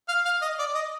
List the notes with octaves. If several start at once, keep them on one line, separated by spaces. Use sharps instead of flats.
F5
F5
D#5
D5
D#5